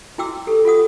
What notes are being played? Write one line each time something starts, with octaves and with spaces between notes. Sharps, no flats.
E4 F#4 G5 D6 E6
G4 A4
F4 A4 F#5 D#6